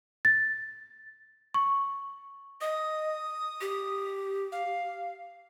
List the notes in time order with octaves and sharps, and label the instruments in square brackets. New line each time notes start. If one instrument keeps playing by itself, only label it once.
[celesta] A6
C#6
[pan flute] D#5 [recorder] D#6
[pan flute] G4
[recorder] F5